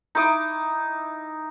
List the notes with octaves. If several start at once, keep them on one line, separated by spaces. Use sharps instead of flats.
D#4 E4 D6 D#6